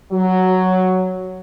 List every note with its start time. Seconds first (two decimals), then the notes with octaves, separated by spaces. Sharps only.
0.11 F#3